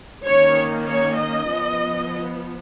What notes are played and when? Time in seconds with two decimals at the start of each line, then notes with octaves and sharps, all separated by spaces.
0.25 D#3 A#3 C#4 C#5
0.88 C#5
1.19 D#5
1.50 F3 B3